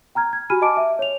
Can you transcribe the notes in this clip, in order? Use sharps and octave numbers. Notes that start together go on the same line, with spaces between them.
G5 A#5 F6 G#6
G#6
F#4 G4 G#5 B5 F6 D#7
D#5 G#5 A5 D6 D7
E5
C#5 F7